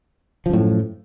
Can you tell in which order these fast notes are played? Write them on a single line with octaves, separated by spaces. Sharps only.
F3 F#2 A2